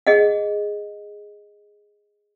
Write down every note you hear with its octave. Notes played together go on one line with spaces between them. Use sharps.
G#4 D#5 F#5